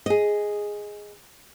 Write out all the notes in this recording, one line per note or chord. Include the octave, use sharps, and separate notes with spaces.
G#4 D#5